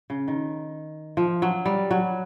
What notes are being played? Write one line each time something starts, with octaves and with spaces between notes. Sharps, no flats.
C#3
D#3
F3
F#3
G3
F#3